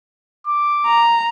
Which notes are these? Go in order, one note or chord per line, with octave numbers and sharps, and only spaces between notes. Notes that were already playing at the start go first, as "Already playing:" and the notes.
D6
A#5